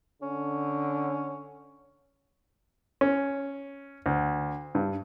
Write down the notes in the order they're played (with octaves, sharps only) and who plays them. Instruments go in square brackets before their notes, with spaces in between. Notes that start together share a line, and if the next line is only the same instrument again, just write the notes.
[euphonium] D3 [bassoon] C#4
[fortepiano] C#4
D2
G2